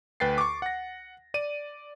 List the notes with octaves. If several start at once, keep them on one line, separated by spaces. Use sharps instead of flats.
D2 B4 G5 A6 C7
C#6 D6
F#5 A#6
D5 D#7